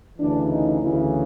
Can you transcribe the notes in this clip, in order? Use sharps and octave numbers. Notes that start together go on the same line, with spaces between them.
D2 C#3 E3 D4
D#4
D2 C#3 E3 E4